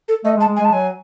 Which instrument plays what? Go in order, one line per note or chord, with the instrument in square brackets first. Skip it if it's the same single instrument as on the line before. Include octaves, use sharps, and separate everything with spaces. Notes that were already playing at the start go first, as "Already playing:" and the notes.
[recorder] A4
[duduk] A3 [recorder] D#5
[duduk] G#3
[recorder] A5
[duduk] G#3
[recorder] G#5
[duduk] G#3
[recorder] A5
[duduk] F#3 [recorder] G#5